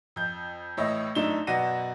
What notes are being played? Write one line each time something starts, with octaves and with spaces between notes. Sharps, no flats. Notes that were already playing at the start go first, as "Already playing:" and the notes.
F2 G6
A1 A2 C#5 D#5 E5
F#2 A3 D4 D#4 E7 G7
F#2 B2 D5 F#5 A#6 D#7